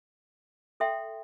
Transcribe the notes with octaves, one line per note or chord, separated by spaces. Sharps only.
A4 E5 G5 C6